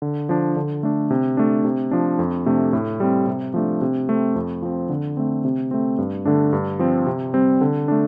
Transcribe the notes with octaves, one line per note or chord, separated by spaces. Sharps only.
D3
F3 D4
D3
A3 D4
C3
A3 D4
C3
F3 D4
F2
C3 A3 D4
A2
G3 C4
C3
F3 A3 D4
C3
A3 C4
F2
F3 C4
D3
A3 C4
C3
A3 C4
G2
D3 A3 D4
G2
F3 C4
C3
G3 C4
D3
A3 D4